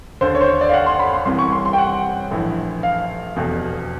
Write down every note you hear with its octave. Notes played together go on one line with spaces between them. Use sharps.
D#2 D3 C5
C#5
C5
C#5
D5
F5
F#5
C6
B5
C6
C2 C3 E3 C6
C#6
C6
C6
G5
F#5
A#1 A2 E3
F5
F1 E2 B2